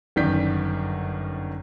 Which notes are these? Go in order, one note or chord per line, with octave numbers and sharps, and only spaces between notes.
G1 F#2 D#3 D5 G6 B6